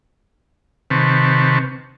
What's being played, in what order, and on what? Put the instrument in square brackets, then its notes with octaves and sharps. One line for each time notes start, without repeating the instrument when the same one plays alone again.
[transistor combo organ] C3 D#3 C4 B4 A5 C#6